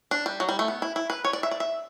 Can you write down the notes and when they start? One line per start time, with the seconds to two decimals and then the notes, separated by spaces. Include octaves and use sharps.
0.11 D4
0.26 G3
0.40 F#3
0.49 G3
0.59 A3
0.68 B3
0.82 E4
0.96 E4
1.10 B4
1.25 C#5
1.33 D5
1.43 E5
1.51 D5
1.60 E5